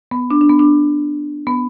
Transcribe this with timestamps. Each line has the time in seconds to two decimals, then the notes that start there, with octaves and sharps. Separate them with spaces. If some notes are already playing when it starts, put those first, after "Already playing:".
0.11 B3
0.31 D4
0.41 D4
0.49 B3
0.59 D4
1.47 B3